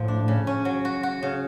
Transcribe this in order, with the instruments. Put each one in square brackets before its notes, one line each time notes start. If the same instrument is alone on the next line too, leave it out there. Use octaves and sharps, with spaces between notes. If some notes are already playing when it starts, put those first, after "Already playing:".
Already playing: [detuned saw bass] A2 [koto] F3
[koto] D4
C#3
C#4
F#3
F#4
F#4
C#3